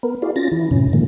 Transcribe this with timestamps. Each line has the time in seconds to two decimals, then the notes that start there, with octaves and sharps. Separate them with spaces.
0.03 B3 A#4 B4
0.22 E4 F#4 G#4 D5 F5
0.36 C#4 F4 A6 A#6
0.52 E3 E4
0.71 F#2 A2 C3 C#4
0.93 A#2 D3 D#3 F3 G#3 A#3